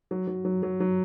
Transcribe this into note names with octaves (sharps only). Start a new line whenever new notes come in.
F#3
F#3
F#3
F#3
F#3